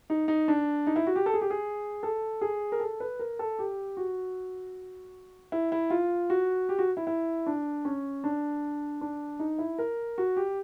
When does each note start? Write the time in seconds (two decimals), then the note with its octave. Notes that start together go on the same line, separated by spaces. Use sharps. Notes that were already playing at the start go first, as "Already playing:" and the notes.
0.10 D#4
0.28 D#4
0.48 D4
0.87 D#4
0.96 E4
1.07 F#4
1.16 G4
1.26 A4
1.34 G#4
1.41 G4
1.50 G#4
2.03 A4
2.41 G#4
2.72 A#4
2.80 A4
3.00 B4
3.19 A#4
3.39 A4
3.59 G4
3.97 F#4
5.52 E4
5.72 E4
5.90 F4
6.30 F#4
6.69 G4
6.79 F#4
6.97 E4
7.07 E4
7.46 D4
7.85 C#4
8.24 D4
9.01 D4
9.40 D#4
9.59 E4
9.78 A#4
10.18 F#4
10.37 G4